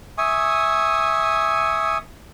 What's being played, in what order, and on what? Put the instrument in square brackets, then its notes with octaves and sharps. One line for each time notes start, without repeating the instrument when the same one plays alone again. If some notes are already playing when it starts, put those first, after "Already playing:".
[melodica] E5 G#5 C#6 D#6